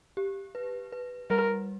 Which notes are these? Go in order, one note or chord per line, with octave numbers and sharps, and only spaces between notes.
G4
B4
B4
G3 A#4